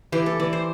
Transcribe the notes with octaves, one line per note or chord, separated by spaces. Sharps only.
E3 G4
A4
E3 D5
C5